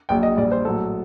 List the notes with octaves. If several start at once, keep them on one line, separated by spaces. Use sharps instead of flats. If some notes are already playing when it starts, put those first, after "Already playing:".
A#1 A#2 F#3 G5
D#5
A#1 A#2 G3 D5
C5
A#1 A2 F#3 A4